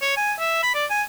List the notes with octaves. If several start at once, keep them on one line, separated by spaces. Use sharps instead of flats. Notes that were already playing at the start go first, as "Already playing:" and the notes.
C#5
G#5
E5
B5
D5
G#5